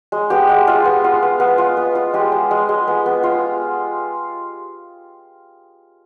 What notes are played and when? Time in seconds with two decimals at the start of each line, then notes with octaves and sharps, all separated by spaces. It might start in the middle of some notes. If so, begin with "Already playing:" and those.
0.12 G#3
0.30 B3 G4
0.49 G#3
0.67 G#3 F4
0.85 B3
1.04 F4
1.23 B3
1.40 B3
1.58 F4
1.77 B3
1.95 F4
2.14 G#3 G4
2.32 G#3
2.51 G#3
2.69 G#3
2.88 B3
3.06 B3
3.23 F4